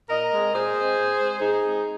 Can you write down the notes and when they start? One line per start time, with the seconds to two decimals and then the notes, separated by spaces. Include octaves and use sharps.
0.09 A#2 A#4 D#5
0.32 G#3 C4
0.53 A#2 G#4 C5
0.76 G#3 C4
0.97 A#2
1.18 G#3 C4
1.40 A#2 D#4 G#4
1.63 G#3 C4